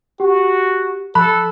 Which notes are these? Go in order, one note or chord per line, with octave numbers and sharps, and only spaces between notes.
F#4 G4
F3 A4 B5 F#6